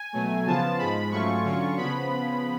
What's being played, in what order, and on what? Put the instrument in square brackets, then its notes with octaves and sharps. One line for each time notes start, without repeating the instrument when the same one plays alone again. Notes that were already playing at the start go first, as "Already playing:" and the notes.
Already playing: [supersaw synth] G#5
B2 F#3 A3
C#3 F3 B3 F4 A5
G#2 F3 G#3 B5
G#2 F#3 A3 C#4 F4 C#6
D3 F#3 C#4 F4
C#3 F3 B3 B5